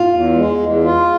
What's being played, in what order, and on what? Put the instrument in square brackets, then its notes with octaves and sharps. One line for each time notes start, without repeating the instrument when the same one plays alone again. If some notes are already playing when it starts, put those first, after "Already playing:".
Already playing: [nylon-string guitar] F4
[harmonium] E2
G#3
E2
F4